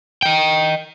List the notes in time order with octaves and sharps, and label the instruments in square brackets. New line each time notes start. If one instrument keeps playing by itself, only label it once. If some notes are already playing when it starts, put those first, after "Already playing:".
[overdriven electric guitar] D#5 G5